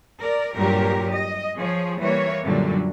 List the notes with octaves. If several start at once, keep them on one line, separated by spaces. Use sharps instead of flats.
A#4 D5
G2 A#2 F#3 G4 A#4
D#5
F3 G#4 C#5
E3 G3 A#3 C#5
F#2 A#2 D3 F#3 G3